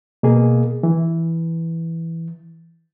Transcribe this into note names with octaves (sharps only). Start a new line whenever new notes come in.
B2 A#3 G#4
E3